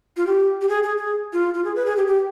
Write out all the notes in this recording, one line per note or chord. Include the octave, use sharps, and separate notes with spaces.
F4
G4
G4
G#4
G#4
G#4
F4
F4
G#4
B4
G#4
G4
G4